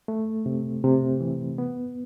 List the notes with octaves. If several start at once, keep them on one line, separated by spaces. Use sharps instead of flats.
A3
C3
C3
E3
B3